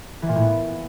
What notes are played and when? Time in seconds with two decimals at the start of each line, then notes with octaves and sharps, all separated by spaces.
0.22 E3
0.29 A#2
0.35 A2
0.42 B3